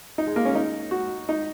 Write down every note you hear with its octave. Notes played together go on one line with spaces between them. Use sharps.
D#4
G#3
A#3
C#4
D#4
F#4
D#4